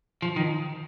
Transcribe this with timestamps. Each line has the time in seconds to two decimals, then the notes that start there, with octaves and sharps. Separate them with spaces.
0.22 F3
0.36 D#3